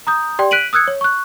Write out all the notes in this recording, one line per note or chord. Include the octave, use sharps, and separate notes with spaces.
A#5 D#6 G6
G4 D5 G5 C6
F#6 B6 D7 D#7 F#7
D#6 E6 F#6 G#6 C#7
C#5
C#6 F#6